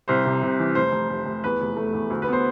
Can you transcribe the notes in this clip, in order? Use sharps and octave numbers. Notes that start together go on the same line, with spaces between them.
C2 C5
C3
C3
E3
F1 C5
F1
F1
F1
E2 B4
F1
A3
E2
D2
B4
B3 C5